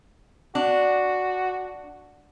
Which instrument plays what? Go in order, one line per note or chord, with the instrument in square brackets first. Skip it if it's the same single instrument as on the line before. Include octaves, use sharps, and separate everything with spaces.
[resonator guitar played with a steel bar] D4 [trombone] F#4